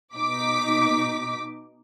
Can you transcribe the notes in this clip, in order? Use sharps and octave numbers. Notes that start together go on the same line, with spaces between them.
B2 D#4 D6 B6